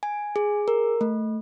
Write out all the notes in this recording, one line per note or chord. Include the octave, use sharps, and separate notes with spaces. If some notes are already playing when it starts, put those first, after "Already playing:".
G#5
G#4
A#4
A3